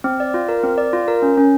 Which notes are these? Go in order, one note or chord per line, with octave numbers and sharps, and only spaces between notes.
C4
D5
F4
A#4
C4
D5
F4
A#4
C#4
C#4